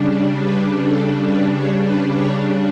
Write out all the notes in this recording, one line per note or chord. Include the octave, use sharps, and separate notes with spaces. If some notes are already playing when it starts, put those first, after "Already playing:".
Already playing: C#3 G3 D4
B4
A4
B4
C#5
B4
C#5